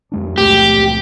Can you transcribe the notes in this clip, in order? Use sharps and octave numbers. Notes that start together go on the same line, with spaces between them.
F2 G#3 D4
C#2 A#2 A3 G4